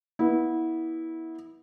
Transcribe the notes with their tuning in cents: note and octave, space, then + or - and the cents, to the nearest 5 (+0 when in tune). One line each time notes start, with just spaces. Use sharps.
B3 -25 E4 -20